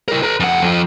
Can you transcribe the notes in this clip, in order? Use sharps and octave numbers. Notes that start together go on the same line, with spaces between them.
E4 A#4
B4 A#5
F2 F#5
F2 F3